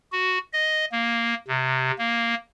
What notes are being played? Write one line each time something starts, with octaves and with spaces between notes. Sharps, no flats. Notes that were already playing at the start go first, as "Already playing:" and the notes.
F#4
D#5
A#3
C3
A#3